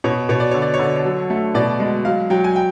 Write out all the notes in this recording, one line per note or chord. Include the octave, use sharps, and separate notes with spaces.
B2 C#5
B2 C#5
D5
D3 C#5
D5
C#5
D3
D5
C#5
F#3
A3
B2 D5
G#3
F#3 F5
F#3 G5
G#5
G5